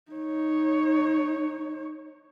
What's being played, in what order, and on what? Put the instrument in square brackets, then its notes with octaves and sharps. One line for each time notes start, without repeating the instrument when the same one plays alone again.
[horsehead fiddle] D#4 C#5